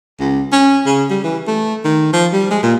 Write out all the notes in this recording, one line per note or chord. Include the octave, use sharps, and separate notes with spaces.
C#2
C#4
C#3
G3
E3
A3
D#3
F3
G3
G#3
A#2